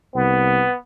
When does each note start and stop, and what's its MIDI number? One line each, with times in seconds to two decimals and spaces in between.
0.15 0.65 36
0.15 0.77 59